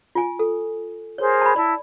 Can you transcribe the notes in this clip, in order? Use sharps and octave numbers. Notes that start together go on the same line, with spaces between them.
F4 G#5
A4
G#4 A#4 C5 C#5
A5 B5
E4 D5 A5